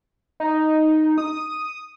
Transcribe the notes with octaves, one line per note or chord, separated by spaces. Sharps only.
D#4
D#6